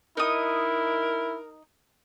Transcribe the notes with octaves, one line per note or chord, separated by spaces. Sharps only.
D#4 E4 A#4 D#6